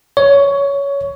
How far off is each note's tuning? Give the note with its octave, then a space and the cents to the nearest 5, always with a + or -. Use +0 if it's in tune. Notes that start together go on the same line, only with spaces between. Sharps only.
C#5 +15